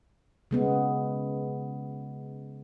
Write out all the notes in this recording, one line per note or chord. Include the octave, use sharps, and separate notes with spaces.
C#3 G#3 B3